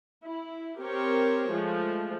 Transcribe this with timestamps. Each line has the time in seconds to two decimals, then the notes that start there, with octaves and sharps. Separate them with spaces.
0.25 E4
0.80 C4 G4 A#4 C5 C#5
1.50 F3 G#3 A3